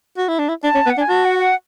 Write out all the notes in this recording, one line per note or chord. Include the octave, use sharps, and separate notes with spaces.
F#4
E4
D4
E4
D4 A5
C#4
B3
F#5
D4 G#5
F#4 A5
F#5
F#5